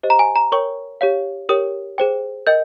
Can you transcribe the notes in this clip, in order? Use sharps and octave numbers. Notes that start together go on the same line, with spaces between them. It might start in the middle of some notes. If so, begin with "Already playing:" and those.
G4 C5 D#5
A#5
G#5
A#5
A#4 C#5 G5 C#6
G4 C#5 F5
G4 A#4 C#5 G5 D#6
G#4 C5 G5
A#4 D#5 G5 G6